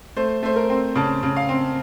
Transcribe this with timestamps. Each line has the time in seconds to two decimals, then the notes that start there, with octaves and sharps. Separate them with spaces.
0.17 A3 C5
0.43 A3 C5
0.56 A#4
0.70 C4
0.95 C#3 A5
1.23 C#3
1.36 F5
1.49 C4